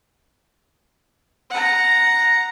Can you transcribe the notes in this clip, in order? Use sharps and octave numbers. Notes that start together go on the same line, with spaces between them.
F#5 A#5